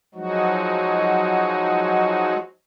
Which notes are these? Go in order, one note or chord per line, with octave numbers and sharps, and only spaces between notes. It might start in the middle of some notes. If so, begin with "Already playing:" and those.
F3 F#3 G#3 D#4 F#4